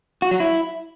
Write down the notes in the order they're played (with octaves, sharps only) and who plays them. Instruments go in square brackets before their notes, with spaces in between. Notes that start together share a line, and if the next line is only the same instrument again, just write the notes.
[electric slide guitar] F#4
F#3
E4